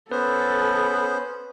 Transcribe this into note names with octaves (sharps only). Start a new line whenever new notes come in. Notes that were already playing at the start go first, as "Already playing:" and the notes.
B3 C#4 A4 B4 C5